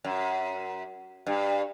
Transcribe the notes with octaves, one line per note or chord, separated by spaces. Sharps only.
F#2
G2